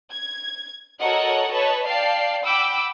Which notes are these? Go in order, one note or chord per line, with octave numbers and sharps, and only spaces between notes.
G#6
F#4 A4 A#4 C#5 D#5 F#5
B4 C#5 D#5 A5
D5 F5 G5 A5 C7
F#5 G5 B5 D6 E6